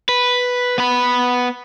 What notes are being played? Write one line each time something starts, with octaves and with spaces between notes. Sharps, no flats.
B4
B3 B5